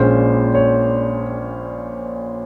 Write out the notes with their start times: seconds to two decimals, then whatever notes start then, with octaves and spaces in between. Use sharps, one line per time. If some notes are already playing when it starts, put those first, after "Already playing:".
Already playing: A#1 A#2 G#3 C#4 C5
0.55 C#5